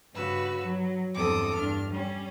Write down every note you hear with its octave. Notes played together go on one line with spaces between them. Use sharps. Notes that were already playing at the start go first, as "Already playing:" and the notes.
G2 C#3 F#4 B4 E6
F#3
E2 G2 C4 A4 D6 D#6
G2 D4 F6
G3 C#4